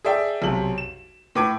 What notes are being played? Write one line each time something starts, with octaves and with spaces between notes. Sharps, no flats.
G#4 A4 D5 E5 G5
B1 C3 F#7
E7
A2 B4 D6 G#6 D7